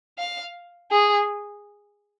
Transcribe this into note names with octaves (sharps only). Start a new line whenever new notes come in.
F5
G#4